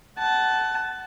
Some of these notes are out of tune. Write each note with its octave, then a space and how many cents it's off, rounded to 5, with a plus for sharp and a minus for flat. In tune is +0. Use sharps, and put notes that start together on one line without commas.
F#5 +20 A5 -10